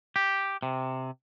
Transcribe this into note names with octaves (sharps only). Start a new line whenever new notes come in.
G4
C3